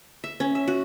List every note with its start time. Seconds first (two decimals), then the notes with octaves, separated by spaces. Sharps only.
0.24 E5
0.40 C#4
0.55 E5
0.68 F#4